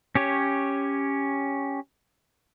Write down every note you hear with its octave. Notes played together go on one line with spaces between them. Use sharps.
C#4 G4 C#5